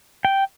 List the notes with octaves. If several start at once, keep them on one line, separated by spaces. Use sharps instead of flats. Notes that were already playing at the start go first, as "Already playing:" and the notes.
G5